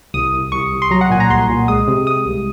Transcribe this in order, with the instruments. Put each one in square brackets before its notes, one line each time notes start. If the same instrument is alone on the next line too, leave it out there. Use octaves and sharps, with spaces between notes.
[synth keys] C2 D#6
C2
C2 C#6
C2
C6
F#3 A#5
F#5
A#2 G#5
A#5
C2 C6
A#2
G#3 D#6
C3
C3 D#6
C2